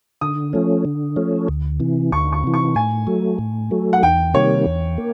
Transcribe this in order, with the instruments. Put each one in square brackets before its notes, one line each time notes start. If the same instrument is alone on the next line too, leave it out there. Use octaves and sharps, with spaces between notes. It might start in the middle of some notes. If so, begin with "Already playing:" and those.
[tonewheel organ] D3 [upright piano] D#6
[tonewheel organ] F3 A3 C#4
D3
F3 A3 C#4
D2
C3 E3
[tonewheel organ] D2 [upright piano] C#6
[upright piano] C#6
[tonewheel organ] C3 E3
[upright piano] C#6
[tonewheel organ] A2 [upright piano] G#5
[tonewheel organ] F#3 A3
A2
F#3 A3
[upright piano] F#5
[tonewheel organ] E2 [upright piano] G5
[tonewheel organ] C3 D#3 G3 A#3 [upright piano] C#5
[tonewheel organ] E2
A#3